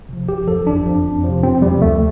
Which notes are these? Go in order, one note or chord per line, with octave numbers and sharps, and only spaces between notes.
C3 F3
G1 G4
F2 F3 A4
G1 D4
F2 F3
F2
C3 F3
F2 C4
C3 F3 G3
D2 A3